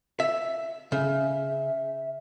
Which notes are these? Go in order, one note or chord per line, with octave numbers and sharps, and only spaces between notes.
E5
C#3 E5